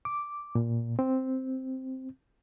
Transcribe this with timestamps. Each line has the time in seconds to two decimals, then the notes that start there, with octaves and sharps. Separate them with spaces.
0.05 D6
0.55 A#2
0.99 C4